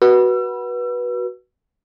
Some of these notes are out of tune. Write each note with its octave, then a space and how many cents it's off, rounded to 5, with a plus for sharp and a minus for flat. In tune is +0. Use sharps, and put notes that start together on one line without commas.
F#4 +10 B4 -20 E6 +35